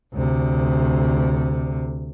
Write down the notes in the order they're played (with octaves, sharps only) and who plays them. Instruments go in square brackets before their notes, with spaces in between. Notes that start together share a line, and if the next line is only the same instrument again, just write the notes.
[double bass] D2 C3